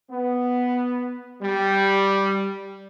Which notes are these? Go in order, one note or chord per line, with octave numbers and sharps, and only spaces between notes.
B3
G3